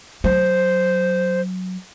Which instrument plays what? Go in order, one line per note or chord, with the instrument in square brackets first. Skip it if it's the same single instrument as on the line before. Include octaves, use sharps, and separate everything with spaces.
[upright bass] F#3 [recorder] C5